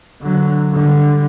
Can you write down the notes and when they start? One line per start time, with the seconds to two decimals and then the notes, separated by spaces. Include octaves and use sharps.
0.21 D3 F#3
0.72 D3 G3